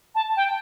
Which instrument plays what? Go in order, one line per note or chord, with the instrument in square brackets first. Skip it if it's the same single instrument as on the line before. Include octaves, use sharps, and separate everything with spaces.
[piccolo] A5
G5